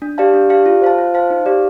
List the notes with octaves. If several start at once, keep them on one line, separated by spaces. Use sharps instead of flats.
D4
G4 D5 F5 A5
D4
G4 D5 F5 A5
F4
C5 F5 A5
F4
C5 F5 A5
D#4
G4 D5 F5